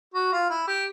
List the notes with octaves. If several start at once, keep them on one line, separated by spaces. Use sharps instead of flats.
F#4
F4
E4
G4